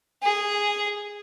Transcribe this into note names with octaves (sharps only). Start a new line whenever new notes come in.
G#4